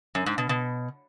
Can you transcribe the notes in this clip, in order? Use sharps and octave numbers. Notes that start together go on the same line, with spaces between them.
F#2
G#2
B2
B2